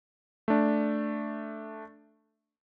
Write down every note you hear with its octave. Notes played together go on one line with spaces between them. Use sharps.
A3 D4